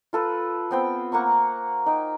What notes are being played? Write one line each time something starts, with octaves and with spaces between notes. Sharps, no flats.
F4 A4 B4
B3 C4 G5
A#3 F#5 A#5 C#6
D#4 G5